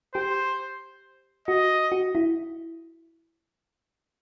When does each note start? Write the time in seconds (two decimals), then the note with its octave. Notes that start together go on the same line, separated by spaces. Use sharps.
0.14 G4 C5
1.48 F#4 D#5
1.92 F#4
2.15 E4